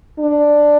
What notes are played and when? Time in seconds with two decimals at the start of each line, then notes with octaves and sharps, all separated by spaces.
0.20 D4